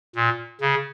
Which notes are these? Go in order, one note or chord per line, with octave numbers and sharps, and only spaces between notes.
A#2
C#3